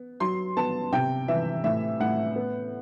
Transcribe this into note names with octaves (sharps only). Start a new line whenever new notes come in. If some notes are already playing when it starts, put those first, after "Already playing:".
Already playing: B3
F#3 C6
B3 A5
C3 G5
E3 E5
A2 E5
A2 F#5
B3